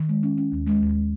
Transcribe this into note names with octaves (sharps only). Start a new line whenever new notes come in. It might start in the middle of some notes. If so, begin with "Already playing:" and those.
Already playing: D#3
G#3
C#4
C#4
D#2
G#3
D#2
G#3